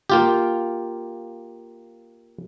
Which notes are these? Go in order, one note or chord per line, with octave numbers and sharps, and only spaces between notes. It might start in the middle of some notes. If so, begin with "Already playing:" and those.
A#3 F4 G4